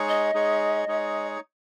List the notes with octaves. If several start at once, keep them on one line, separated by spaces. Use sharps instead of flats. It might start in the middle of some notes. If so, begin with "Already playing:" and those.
Already playing: G#3 D#4 G#4 C#5
D#5
G#3 D#4 G#4 C#5
G#3 D#4 G#4 C#5